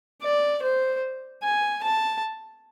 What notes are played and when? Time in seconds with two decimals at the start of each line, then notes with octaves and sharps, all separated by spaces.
0.22 D5
0.62 C5
1.43 G#5
1.83 A5